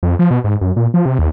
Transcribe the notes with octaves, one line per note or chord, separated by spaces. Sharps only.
F2
F3
B2
G#2
F#2
A#2
F3
C3
D#2